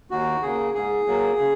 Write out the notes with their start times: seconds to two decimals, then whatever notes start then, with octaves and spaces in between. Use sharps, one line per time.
0.10 D#2 F#4
0.42 C#3 A#3 G#4
0.74 G#2 G#4
1.07 F#3 A#3
1.39 C#3